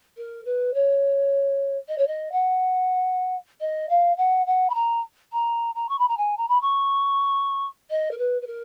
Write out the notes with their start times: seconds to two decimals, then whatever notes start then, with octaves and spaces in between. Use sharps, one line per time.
0.17 A#4
0.45 B4
0.74 C#5
1.88 D#5
1.98 C#5
2.07 D#5
2.32 F#5
3.61 D#5
3.90 F5
4.17 F#5
4.46 F#5
4.70 B5
4.74 A#5
5.33 A#5
5.75 A#5
5.89 C#6
5.99 B5
6.08 A#5
6.17 G#5
6.37 A#5
6.48 B5
6.61 C#6
7.90 D#5
8.11 A#4
8.18 B4
8.42 B4
8.47 A#4